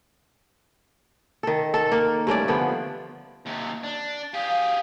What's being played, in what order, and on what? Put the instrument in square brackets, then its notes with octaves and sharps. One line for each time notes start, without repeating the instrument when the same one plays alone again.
[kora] D#3 A4
A4
A#3
G2 A3 C#4 D5
D3 F3 B3
[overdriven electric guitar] D#2 C3
D4
[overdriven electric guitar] G4 G#4 [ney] F5